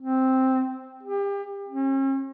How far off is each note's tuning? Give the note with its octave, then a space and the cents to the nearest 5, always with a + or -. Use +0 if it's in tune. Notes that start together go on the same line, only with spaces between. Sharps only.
C4 +0
G4 +35
C#4 -45